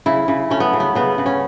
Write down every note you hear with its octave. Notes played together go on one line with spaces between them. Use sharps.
C#3 E4
C#3
A3 C#4
B3
C#3
B3
C#3 B3
C#3
C#4